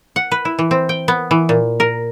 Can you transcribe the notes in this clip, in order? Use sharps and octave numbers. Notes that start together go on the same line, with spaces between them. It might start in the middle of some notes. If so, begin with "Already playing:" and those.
F#5
B4
E4
E3
C4
G5
B3
E3
A#2
A#4